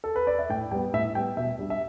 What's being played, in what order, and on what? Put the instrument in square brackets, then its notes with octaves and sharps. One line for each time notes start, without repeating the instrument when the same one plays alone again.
[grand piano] A4
B4
D5
E5
A2 G5
G3 B3 G5
A2 E5
G3 B3 G5
B2 E5
G3 D4
E5